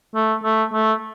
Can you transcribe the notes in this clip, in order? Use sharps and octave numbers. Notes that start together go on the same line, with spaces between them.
A3
A3
A3